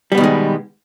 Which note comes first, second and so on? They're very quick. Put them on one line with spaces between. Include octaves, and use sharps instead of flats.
G3 B3 B2 D#3 G#3